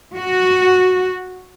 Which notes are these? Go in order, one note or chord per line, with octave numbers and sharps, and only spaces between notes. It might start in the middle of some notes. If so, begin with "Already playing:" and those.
F#4